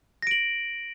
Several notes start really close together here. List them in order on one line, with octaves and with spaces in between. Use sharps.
A#6 D7 F#7